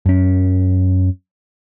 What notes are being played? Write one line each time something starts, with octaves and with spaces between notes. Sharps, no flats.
F#2 C#4